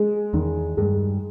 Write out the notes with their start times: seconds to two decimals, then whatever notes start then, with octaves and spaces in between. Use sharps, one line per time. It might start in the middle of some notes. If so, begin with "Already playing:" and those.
Already playing: G#3
0.33 E2 D#3
0.77 G2 G#3